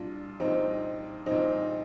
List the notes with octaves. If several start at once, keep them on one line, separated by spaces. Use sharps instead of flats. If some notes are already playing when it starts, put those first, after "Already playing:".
Already playing: C2 A#2 D4 F4
C2 A#2 C4 D#4
C2 A#2 C4 D#4